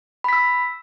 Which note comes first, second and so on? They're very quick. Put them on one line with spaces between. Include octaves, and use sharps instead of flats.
B5 B6 E6